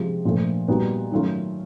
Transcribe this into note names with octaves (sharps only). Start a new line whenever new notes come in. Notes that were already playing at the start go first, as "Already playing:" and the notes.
Already playing: C3 F3 G#3
A#2 F3 A3
A#2 G3 B3 D#4 F#4
D#3 F#3 A3 C#4 F4